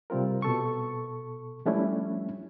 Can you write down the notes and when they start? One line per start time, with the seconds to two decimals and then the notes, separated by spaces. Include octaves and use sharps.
0.10 C3 G3 C4 F4 A#4
0.42 B2 A4 C#6
1.66 F3 G3 A3 C#4 D4 E4